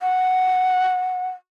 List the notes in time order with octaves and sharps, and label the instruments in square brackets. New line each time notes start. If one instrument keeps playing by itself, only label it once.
[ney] F#5